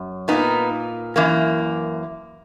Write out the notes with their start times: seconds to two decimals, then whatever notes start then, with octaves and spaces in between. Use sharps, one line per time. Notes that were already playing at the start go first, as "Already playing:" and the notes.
Already playing: F#2
0.28 A#2 A#3 B3 D#4
1.16 F#2 E3 A#3